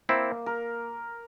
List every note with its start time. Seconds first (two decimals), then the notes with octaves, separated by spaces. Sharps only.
0.09 A#3 C4 E4
0.46 A#4